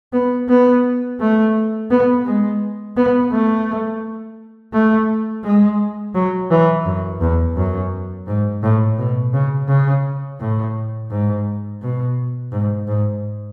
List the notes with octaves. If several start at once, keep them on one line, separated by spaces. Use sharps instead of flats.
B3
B3
A3
B3
G#3
B3
A3
A3
G#3
F#3
E3
F#2
E2
F#2
G#2
A2
B2
C#3
C#3
A2
G#2
B2
G#2
G#2